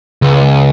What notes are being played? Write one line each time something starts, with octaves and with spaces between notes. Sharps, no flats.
C#2